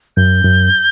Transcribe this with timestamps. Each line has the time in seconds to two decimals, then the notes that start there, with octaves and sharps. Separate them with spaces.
0.17 F#2 G6
0.44 F#2